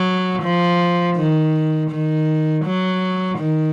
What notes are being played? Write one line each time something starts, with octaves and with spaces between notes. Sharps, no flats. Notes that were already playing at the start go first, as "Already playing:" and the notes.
Already playing: F#3
F3
D#3
D#3
F#3
D#3